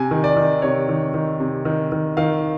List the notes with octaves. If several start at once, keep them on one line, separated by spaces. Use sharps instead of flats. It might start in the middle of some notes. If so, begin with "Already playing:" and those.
Already playing: C3 G#5
D#3
D5
D#3
C3 C#5
D#3
D#3
C3
D#3
D#3
D#3 F5